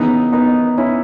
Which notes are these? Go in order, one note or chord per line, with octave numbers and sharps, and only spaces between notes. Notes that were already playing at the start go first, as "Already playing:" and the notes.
Already playing: D#2 C#3 E3 B3 D#4
B3 D#4
C#4 E4